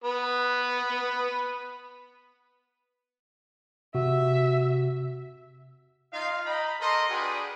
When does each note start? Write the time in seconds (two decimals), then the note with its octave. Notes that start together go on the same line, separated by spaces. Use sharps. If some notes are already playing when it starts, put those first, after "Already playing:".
0.04 B3 B4
3.95 C3 F#4 E5
6.13 D#4 F4 F5
6.45 D#5 G5 A#5 B5
6.81 A4 A#4 C5 D#5 A#5 C6
7.09 D4 F4 F#4 G#4 B4 G5